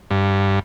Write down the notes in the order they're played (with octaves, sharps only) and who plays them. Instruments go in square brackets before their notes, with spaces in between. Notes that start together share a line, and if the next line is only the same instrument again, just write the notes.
[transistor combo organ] G2